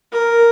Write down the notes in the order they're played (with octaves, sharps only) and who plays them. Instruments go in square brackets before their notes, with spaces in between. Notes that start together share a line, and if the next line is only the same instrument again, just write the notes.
[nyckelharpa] A#4